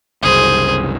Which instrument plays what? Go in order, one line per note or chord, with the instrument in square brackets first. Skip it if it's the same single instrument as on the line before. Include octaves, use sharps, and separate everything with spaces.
[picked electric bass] F#1 C2 [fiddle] G#4 C5